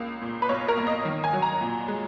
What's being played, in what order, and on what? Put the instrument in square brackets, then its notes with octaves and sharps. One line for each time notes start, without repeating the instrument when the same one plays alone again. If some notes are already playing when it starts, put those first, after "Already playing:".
Already playing: [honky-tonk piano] C#2 A#3
A#2
B4
B1 C#5
A#4
A#3
D#5
D#3
G#5
F#3
A#5
A#2
G#3